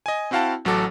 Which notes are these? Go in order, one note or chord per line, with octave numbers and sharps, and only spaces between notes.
D#5 G#5
C4 E4 F#4 F5 G5 A5
A1 F#3 F#4 A4 D6